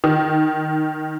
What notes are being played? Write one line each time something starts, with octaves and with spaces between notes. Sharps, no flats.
D#3